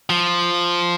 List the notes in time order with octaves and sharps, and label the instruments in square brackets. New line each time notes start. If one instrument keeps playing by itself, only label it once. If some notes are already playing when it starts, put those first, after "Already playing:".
[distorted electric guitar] F3